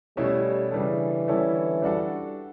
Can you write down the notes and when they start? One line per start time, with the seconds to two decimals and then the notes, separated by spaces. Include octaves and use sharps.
0.17 B2 G3 A3 C#4 E4
0.72 C#3 E3 G3 D4 A4
1.28 D3 G3 C#4 E4 A4
1.82 G3 D4 F#4 A4